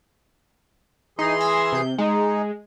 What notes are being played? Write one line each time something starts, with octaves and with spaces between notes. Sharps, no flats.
E3 D#4 G#4 C6
E6 G#6 A#6
C3 G6
G#3 D#4